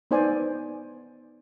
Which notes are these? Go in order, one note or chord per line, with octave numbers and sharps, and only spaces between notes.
B3 D#4 C5 D5 G#5